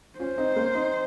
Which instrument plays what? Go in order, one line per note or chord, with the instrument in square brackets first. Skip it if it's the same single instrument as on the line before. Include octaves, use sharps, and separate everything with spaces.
[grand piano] C#4 F4 [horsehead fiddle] C5
[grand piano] C4 D#4
A#3 C#4
C4 D#4